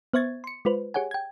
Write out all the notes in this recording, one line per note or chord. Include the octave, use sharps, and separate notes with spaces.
B3 C5 E5 C#6 G#6 A6
C6 C#7
G#3 F4 B4 C5
G4 G#4 C#5 F#5 G#5
G5 G#6